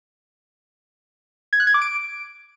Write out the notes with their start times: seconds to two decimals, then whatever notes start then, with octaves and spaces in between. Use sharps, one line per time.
1.53 G#6
1.60 F#6
1.67 G#6
1.74 D6
1.82 D7